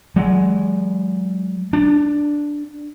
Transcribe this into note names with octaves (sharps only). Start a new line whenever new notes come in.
F#3 G#3
D4